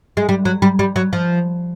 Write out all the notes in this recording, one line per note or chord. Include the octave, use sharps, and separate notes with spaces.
G#3
G3
F#3
G3
G3
F#3
F3